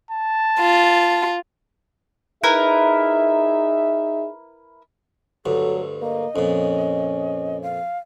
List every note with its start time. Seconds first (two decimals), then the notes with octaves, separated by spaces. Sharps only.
0.11 A5
0.60 F4
2.44 D#4 E4 G#4 A#4 B4 E5
5.46 D2 G2 F#3 A4
6.02 A#3 D#5
6.36 F2 A#2 C#4
7.62 F5